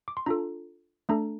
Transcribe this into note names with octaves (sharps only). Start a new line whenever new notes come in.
D6
C6
D4 F4 A4 A#5
A3 D4 A4 A#5